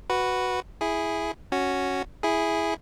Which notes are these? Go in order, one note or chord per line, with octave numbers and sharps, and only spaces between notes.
F#4 B4
E4 G#4
C#4 F#4
E4 G#4